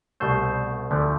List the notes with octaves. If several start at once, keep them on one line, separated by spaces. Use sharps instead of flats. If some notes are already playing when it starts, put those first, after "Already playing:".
C2 B2 A3 C5
D2 D3 F3 A3